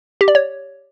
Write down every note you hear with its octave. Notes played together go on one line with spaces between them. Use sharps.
G4
D5
C#5